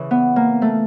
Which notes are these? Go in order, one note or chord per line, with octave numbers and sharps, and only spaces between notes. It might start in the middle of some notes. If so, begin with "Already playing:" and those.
Already playing: C#3 E3
B3
A#3
A3